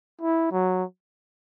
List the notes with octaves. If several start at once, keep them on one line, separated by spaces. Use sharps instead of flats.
E4
F#3